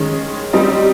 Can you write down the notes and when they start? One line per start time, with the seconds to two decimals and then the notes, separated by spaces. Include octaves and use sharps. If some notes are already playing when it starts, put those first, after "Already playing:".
Already playing: D#3 G#3 C#4
0.53 G3 C4 D#4